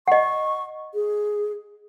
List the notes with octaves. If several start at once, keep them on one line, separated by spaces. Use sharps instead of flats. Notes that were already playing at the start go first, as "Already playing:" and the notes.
D#5 F#5 C#6
G#4